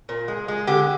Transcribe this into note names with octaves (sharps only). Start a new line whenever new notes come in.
A#2
G#3
G#3
D3 G4